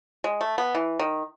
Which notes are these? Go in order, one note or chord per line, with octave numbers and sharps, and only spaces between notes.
G#3
A3
B3
E3
D#3